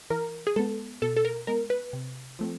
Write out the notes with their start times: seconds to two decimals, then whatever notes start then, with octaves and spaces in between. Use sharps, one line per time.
0.10 E3 A#4
0.47 G#4
0.56 G#3 B3 A4
1.02 B2 A4
1.16 A4
1.25 A#4
1.47 G#3 B3 A#4
1.70 B4
1.93 C3
2.39 F3 A3 C4